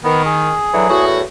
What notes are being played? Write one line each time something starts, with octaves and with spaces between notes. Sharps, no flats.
D#3 B3
G#4
D3 E3 F#3
E2 A2 F#4